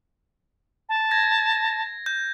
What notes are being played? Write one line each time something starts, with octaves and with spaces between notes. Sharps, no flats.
A5
G#6 A#6
G6